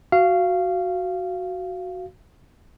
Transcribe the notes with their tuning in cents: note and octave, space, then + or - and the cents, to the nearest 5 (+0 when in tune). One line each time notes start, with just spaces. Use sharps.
F#4 +0 F5 -15